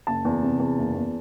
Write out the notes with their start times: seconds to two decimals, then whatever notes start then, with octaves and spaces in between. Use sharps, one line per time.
0.07 F#1 A5
0.25 E2
0.42 C3
0.59 E2
0.77 F#1
0.95 E2